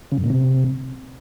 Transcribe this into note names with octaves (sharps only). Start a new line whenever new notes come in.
C#3
F#2
A#2
C3